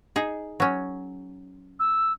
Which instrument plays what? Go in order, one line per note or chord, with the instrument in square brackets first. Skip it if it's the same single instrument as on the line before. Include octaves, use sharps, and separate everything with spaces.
[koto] D#4 G#4
F#3 C#4
[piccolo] E6